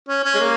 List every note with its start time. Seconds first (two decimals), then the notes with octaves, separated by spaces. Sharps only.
0.08 C#4
0.24 C#4
0.35 G#3
0.40 A#3